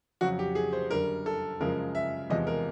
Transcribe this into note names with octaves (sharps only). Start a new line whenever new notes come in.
F2 C#3 F#3 F#4
G4
G#4
C5
F#2 D3 G3 A#4
A4
F#2 C#3 F3 G#3 A#4
E5
E2 C3 F3 G#3 D#5
A#4